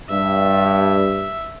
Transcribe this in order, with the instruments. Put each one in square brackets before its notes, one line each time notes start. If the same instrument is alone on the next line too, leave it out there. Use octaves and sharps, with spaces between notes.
[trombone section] G2 [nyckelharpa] E5